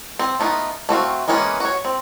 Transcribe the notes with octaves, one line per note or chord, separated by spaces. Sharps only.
C4
A3 B3 D#4 F4
A3 C4 F#4 F5
E3 G#3 A#3 B3 C#4
F#4 C#5
C4